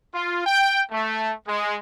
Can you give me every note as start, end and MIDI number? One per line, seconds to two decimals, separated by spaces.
0.14 0.40 65
0.45 0.81 79
0.91 1.32 57
1.47 1.77 56